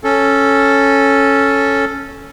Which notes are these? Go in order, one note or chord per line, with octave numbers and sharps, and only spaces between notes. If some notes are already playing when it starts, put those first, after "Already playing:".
C#4 A4